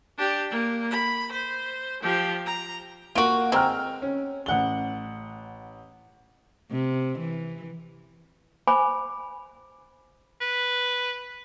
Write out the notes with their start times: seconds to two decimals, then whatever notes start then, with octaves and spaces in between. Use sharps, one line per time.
0.18 D4 G4
0.50 A#3
0.91 B5
1.32 C5
2.02 F3 G4
2.46 A#5
3.15 A#3 F4 F#4 D7
3.52 G#3 C4 G5 A#5 F6
4.02 C#4
4.46 A1 F#5 G7
6.71 C3
7.19 E3
8.67 C5 G#5 B5 D6
10.41 B4